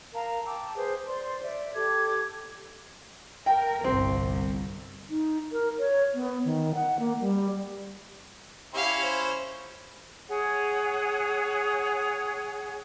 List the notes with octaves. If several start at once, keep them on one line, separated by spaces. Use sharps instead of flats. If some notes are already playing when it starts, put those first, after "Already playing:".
A#4 F5 A5 A#5
G5 A5 D6 E6
G#4 B4 C5
C5 D5 C6
D5 E5
G4 A4 D6 G#6
A#4 G5
G1 C2 C4
D#4
A#4
C#5
B3
D#3
F#5
A#3
G3
C#4 E4 G4 F5
C5
G#4 C#5 F#5